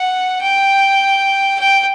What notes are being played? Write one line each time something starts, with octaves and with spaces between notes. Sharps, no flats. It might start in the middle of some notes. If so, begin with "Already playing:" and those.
Already playing: F#5
G5
G5